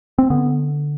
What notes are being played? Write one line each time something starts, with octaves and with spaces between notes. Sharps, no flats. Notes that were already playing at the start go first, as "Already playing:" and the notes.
C4
D3 B3